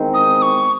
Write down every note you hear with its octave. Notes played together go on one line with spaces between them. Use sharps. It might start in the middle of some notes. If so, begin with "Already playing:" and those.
Already playing: E2 D#3 G#3 C4 D#4
D#6
C#6